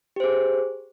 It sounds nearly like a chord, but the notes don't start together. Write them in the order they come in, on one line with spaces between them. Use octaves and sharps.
G4 C5 G#4